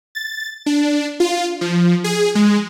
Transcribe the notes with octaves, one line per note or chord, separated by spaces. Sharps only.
A6
D4
F4
F3
G#4
G#3